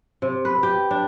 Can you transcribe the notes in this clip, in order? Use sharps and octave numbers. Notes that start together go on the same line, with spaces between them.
C3
B4
G4
D4